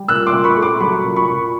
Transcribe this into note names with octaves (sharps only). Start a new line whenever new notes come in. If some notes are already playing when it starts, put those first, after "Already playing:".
Already playing: G3
A#2 E6 F#6
C6 D6
A#2
B5 C#6
A3
C6 D6
F#3 B5 C#6
A#2
B5 C#6
A#2